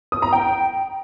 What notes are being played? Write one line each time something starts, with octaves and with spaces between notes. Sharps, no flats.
D#6
A#5
G5